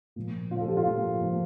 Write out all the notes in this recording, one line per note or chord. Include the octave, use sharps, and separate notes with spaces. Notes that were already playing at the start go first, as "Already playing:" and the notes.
A#2 F3
A#2 F3 F4
A4
G4
F4
A#2 F3
A#2 F3